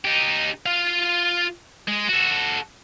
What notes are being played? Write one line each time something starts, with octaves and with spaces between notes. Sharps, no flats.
D#4 G4
F4 F5
G#3
F#4 A4